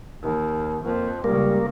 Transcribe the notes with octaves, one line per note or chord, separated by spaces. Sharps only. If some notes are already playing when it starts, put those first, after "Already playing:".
D#2
F2 A#3
C#2 C#3 G3 A#3